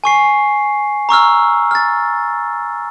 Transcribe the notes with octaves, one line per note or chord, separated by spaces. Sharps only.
G#5 C#6 C7
A#5 C#6 E6 F6
F6 A6